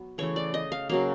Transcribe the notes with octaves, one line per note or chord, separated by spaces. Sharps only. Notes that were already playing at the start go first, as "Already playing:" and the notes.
Already playing: F#3 B3
C#3 E3 A3 C#5
D5
D#5
F5
C#3 F#3 A#3 F5